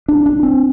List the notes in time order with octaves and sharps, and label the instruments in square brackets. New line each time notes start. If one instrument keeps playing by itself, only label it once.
[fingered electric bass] D4
D4
C4